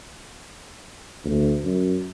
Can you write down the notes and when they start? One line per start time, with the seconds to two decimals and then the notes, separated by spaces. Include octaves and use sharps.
1.25 D2
1.64 F#2